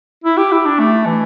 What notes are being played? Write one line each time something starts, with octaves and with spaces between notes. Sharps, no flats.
E4
G4
E4
D4
A3
E3